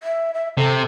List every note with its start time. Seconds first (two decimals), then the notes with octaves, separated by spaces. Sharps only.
0.03 E5
0.34 E5
0.57 C3 A4